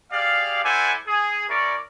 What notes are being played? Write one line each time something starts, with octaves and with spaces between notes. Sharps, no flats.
G4 G#4 D5 F5
E4 A4 C5 D5 F#5 G#5
G#4
C#4 E4 A#4 C#5 D5